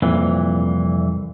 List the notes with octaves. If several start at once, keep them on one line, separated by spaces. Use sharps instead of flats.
C2 F2 A#2 E3